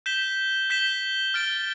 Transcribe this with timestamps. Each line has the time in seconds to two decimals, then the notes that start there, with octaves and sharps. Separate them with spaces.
0.06 G6 B6 E7 G7
0.70 G6 B6 E7 G7
1.34 F6 A6 D7 G7